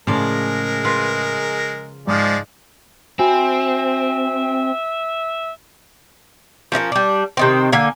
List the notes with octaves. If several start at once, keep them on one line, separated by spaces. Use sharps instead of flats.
A2 C#3 F3 G#3 A#4 D5
F4 B4
G#2 F3 G#3 D5 D#6 F6
C4 F#4 E5 G#5
F3 C#4 D#4 A#4
G3 D4
C3 D#3 C4
D3 A#3 G#5